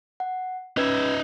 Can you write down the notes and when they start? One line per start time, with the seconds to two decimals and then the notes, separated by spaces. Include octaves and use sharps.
0.20 F#5
0.77 C#4 D#4 B4 E5 G#6